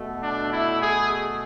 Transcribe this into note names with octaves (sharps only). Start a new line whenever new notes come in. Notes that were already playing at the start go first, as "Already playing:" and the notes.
Already playing: B2 A3
D4
E4
G#4